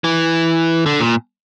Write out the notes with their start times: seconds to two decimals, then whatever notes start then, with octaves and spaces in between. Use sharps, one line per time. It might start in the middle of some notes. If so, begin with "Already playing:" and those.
0.04 E3
0.86 D3
1.00 A#2